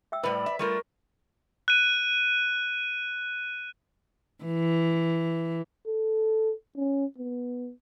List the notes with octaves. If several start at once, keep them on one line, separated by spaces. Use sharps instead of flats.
E5 G5 E6
A2 G3 B4 C5 D5 B5
E5
G3 A3 F4 A#4 C#6
F#6 D#7
E3
A4
C#4
B3